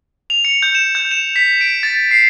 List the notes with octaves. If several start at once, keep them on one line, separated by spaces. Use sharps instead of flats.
F7
C#7
G6
E7
G6
E7
B6
D7
A6
C7